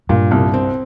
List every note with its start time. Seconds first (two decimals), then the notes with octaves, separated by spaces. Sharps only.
0.09 G2 A#2
0.31 C2
0.54 C4